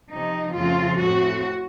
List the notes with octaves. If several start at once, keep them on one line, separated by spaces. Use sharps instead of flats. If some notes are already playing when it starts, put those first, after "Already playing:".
C3 F3 C4 D#4
F2 C#3 F3 A3 C4 F4
A2 A3 C4 F#4